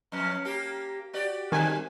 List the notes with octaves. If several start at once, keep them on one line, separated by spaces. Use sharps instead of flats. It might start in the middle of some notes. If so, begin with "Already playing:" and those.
F2 C#4
A#3 G4
F#4 G4 D5
D#3 G3 C4 G#5